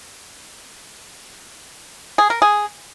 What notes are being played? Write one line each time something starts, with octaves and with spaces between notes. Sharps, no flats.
G#4
A#4
G#4